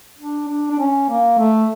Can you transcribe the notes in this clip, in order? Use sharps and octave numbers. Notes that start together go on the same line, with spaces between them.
D4
D4
D4
C#4
A#3
A3